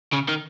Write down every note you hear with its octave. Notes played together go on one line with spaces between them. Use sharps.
C#3
D#3